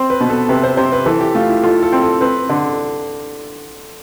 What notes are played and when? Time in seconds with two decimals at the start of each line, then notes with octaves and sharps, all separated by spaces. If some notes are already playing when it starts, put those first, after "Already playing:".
Already playing: C4 C5
0.10 B4
0.20 B2
0.30 A4
0.49 C3 B4
0.63 C5
0.77 C3 C5
0.92 B4
1.06 E3 A4
1.20 G4
1.35 A3 F4
1.49 E4
1.64 F4 A4
1.83 A4
1.92 C4
2.02 A4
2.21 C4 B4
2.50 D3